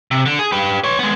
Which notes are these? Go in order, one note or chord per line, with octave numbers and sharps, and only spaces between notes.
C3
D3
G#4
G4 B4
B4 C#5
G#3 B3